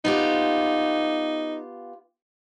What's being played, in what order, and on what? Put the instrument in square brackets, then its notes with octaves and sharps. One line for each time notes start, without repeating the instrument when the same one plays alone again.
[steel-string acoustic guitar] B3 F4 G4 [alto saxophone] D#4